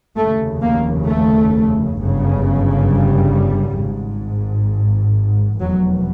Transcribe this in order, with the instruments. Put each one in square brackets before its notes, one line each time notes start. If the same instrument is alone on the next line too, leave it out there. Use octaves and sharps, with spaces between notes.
[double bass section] F1 D#2 C#3 A3
A#3
A3
G1 F#2 C#3
G3
G#1 G#2
F1 E2 B2 F#3